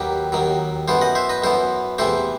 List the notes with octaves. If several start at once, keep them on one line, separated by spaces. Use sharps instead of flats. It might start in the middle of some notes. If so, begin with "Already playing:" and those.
Already playing: D#2 D#3 F#3 G4 B4
D#2 D#3 F#3
F#2 E3 B3 A4 C5
D#5 F#5
C5 E5
B4 D#5
F#2 E3 B3 A4 C5
E2 C3 E3 A3 A4 C5